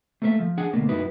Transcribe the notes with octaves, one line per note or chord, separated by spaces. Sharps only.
A3 A#3 A4 C5 E5
F3
D4 G#4 F#5
D2 B2 A3 A#3
F#2 D#4 E4 F#4 B4